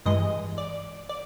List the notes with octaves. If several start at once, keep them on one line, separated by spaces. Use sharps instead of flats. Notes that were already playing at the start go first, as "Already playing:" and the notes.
G2 E3 G#3 D#5
D5
D5